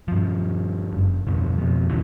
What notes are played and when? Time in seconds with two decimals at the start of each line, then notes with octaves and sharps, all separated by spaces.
0.08 G2 F3
0.93 F#1
1.27 B1 F2 C#3 B3
1.55 F2 B2
1.89 A#1 D#2 C#3 E3